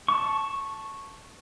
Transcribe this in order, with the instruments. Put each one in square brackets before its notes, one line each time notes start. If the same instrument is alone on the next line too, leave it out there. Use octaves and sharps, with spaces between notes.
[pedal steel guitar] A5 C#6